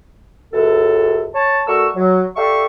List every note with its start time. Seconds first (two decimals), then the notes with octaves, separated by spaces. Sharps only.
0.53 C#2 F#2 A4
1.34 C#5 A5
1.67 A3 F#4 A#4 D5 C#6 E6
1.96 F#3
2.36 G4 A4 D5 E5 F5 C#6